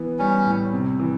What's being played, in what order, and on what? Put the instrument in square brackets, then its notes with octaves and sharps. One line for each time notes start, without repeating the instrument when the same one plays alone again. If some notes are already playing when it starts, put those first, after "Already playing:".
Already playing: [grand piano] E3 B3
[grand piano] G3 [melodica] C#4
[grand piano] A2
C3
E3